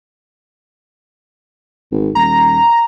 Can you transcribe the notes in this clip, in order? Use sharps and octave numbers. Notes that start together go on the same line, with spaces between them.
G#1
D#1 A#5